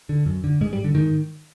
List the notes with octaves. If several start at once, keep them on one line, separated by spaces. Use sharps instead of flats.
D3
F#2
D3
G#2 G#3
G3
D3
G#2 D#3